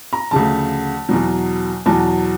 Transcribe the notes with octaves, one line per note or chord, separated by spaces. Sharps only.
A#5
D2 C#3 F3 A5
E2 B2 F#3
E2 B2 F#3 A5